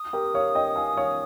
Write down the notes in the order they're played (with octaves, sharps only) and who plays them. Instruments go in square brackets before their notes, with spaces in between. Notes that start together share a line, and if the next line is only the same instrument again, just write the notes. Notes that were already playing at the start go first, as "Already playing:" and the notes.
Already playing: [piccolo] D#6
[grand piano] G4 A#4
C#5 F5
D#5 G5
F5 G#5
C#5 F5